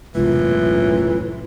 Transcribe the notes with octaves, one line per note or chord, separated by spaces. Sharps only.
E1 C2 F#2 A2 E3 F4